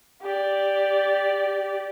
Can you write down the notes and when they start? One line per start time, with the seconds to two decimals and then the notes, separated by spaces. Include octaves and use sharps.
0.22 G4 D5